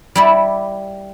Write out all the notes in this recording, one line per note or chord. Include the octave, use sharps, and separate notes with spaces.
G3 E4 D5